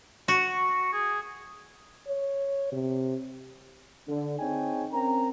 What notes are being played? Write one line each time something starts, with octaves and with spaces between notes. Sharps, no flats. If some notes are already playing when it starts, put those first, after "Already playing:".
F#4 C#6
G#4
C#5
C3
D3
C4 D#4 G#4 C#5 G5 G#5
C4 C#4 A#4 G5 A#5